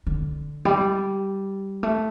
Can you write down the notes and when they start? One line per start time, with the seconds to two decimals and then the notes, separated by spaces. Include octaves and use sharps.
0.07 D3
0.65 G3
1.83 A3